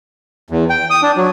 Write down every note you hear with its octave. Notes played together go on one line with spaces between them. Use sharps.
E2
G5
D#6
D4
F#3